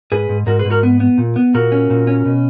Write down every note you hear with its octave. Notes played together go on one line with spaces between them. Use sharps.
G#2 G#4 B4
G#2
G#2 F#4 A#4
G#4 B4
G#2
F#4 A#4
B3
B3
A#2
B3
A#2 F#4 A#4
C#4
A#2
C#4
B2